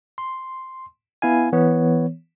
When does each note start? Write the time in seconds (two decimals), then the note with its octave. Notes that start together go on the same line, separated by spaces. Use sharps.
0.18 C6
1.22 B3 E4 F5 G#5
1.53 E3 B3 C#5